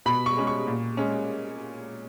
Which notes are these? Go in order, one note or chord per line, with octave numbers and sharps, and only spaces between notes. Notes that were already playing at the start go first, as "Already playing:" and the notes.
B2 B5
C#6
G#3 C#4
C#6
A#2
G#3 C#4